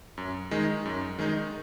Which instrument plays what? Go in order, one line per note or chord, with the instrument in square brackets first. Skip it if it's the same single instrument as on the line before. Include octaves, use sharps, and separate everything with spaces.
[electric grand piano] F#2
D#3 G#3 D#4
F#2
D#3 G#3 D#4